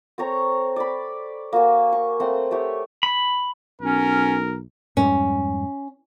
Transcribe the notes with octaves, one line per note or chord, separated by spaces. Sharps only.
C4 A4 C#5 A#5
D5 B5
A#3 F#4 G#5
C#6
A3 C4 F#5 C6
A3 G4 C#5
B5
B1 C#4 A#4
F2 G#2 G3 C#4